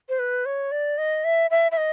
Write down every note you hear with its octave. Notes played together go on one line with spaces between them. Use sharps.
C5
B4
C#5
D5
D#5
E5
E5
E5
D#5